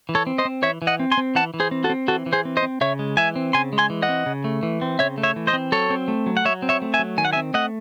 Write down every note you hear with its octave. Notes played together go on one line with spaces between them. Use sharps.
E3
A4 C#5
C4
C5 D#5
C4
E3 C#5 E5
E3
D#5 F#5
C4
G#5 C6
C4
E3 F#5 A5
E3
G#4 C5
C4
F#4 A4
C4
E3 F#4 A4
E3
G#4 C5
C4
C5 D#5
C4
C#3 C#5 E5
G#3
E3 E5 G#5
C4
C#3 G#5 C6
G#3
G#5 C6
E3
D#5 F#5
C4
C#3
A3
E3
C4
C#3 C#5 E5
A3
C#5 E5
E3
C5 D#5
C4
F#3 A4 C#5
C4
A3
F#3
F#5
F#3 C#5 E5
C4
C#5 E5
A3
E5 G#5
F#3
D#3 G#5
F#5
E5 G#5
C4
A3 D#5 F#5